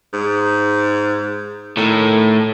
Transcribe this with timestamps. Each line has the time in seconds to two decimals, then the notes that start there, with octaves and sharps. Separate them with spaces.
0.13 G#2
1.77 A2 D#3 A3